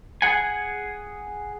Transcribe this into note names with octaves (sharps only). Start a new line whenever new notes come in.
G#4 F#5 G#5